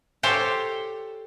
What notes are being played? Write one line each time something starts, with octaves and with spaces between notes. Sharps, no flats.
G4 A4 C5 C#5